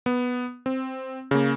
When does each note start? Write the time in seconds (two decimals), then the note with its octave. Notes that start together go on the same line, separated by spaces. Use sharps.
0.06 B3
0.66 C4
1.31 C#3 A#3